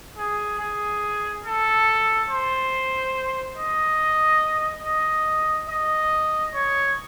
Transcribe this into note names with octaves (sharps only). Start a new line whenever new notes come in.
G#4
G#4
A4
C5
D#5
D#5
D#5
C#5